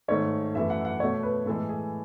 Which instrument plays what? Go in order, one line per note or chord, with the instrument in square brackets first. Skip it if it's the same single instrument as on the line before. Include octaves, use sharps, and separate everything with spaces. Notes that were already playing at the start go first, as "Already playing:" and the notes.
[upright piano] G#2 D#3 A3 C#5
F#2 E3 A3 E5
F#5
F#5
B2 A3 C#5
B4
A2 E3 G#3 A4
G#4